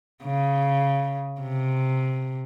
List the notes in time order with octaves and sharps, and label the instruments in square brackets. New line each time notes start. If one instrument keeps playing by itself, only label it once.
[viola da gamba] C#3
C3